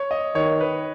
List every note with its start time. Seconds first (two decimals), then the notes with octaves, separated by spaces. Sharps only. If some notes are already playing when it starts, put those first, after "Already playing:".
Already playing: C#5
0.11 D#5
0.35 D#3 C#5
0.61 B4